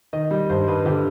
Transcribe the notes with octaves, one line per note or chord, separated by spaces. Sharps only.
D#3 D#5
G3
G2 C5
G2 B4
D3 G4